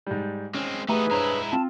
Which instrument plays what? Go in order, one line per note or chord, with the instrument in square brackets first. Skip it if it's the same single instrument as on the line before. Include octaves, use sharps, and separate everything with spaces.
[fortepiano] G#2 G3
[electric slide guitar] G#3 C4 [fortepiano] C#4
[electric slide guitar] E3 B3 D#4 [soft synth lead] A3 [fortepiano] G4 A#5 [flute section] G#4 B4
[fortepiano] G2 C5 C#5 [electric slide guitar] G#3 E4 [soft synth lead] A#5
[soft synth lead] C4 [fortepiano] F4 [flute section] A5